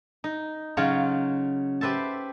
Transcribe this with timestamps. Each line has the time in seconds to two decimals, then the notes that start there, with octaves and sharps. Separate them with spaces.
0.24 D#4
0.77 C#3 F#3 D#4 F4 C#5
1.81 G4 B4 C5 E5 A5